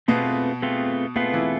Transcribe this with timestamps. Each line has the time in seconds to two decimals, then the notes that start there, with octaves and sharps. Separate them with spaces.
0.08 B2 A3 B3 C4 F4 G#4 B4
0.62 A3 C4 F4 G#4 B4
1.16 B2 A3 B3 C4 F4 G#4 B4
1.33 E3 E4